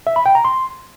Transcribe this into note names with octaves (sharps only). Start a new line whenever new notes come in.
E5
B5
G5
A#5
C6